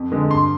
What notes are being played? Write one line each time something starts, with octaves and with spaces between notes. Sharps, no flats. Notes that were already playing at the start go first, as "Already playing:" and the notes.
Already playing: F2
D3 G#3
G2 C6